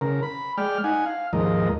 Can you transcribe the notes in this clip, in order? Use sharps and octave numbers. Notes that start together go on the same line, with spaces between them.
C#3 A#4
B5
G#3 D5 G5 F6
D#4 F#5 G#5
F5
D#2 G#2 F3 A#4 D#5